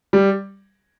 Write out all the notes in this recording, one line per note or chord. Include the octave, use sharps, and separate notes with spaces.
G3